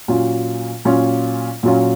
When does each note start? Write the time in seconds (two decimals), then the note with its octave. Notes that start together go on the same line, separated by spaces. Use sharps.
0.08 A#2 F#3 C#4 F4
0.85 A#2 F#3 C#4 F4
1.63 A#2 F#3 C#4 F4